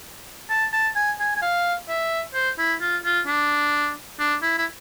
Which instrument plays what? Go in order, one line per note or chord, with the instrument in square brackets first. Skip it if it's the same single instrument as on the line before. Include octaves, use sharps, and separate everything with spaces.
[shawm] A5
A5
G#5
G#5
G#5
F5
E5
C5
E4
F4
F4
D4
D4
E4
E4